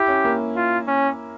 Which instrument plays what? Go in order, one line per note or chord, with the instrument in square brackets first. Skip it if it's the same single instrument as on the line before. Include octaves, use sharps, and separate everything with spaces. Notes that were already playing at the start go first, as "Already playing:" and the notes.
Already playing: [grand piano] E4 [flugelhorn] G4
[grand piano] C#4
A#3
[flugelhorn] F4
C#4